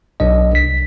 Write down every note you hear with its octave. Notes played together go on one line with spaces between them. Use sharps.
B1 D4 D#5
C2 B6